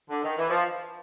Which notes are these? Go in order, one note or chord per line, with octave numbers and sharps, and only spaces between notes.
D3
D#3
E3
F3